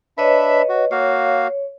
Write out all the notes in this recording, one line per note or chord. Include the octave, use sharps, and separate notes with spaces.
D4 B4 C#5 D#5 E5 B5
F#4
A#3 F#4 C#5 F5